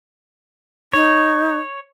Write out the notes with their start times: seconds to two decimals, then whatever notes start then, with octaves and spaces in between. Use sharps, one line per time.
0.93 D#4 C#5